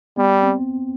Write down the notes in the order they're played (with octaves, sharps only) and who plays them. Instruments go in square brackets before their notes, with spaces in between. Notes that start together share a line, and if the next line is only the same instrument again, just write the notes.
[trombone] G3 [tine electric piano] B3
[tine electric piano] C4